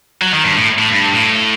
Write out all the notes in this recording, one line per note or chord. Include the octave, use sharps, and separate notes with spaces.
F#3
D#3
G2
A2
A2
G2
A2